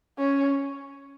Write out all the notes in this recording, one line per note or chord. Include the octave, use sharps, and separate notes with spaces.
C#4